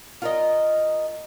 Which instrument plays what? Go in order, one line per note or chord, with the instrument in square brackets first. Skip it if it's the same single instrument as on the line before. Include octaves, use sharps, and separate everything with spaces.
[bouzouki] F4 A#4 D#5